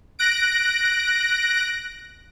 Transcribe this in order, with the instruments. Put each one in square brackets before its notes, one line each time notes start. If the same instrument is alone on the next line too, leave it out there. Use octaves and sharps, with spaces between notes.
[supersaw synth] F#6 A#6 D7